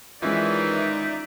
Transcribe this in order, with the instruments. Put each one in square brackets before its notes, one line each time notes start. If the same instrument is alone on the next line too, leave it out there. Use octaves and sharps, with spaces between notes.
[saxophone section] D#3 E3 [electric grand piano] G#3 C#4 F4 [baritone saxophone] D#4 [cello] D5 E5